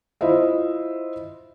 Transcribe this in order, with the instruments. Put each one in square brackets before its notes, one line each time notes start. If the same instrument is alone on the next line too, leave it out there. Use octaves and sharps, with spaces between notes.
[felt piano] E4 F4 C5 D#5 E5